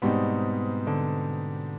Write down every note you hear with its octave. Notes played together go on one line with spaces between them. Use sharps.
G#2 B2 G3 C4 D#4
D3